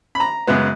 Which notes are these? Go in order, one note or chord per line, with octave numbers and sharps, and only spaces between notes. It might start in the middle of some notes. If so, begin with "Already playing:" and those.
B5
A#5
F#2 C#3 G#3 B3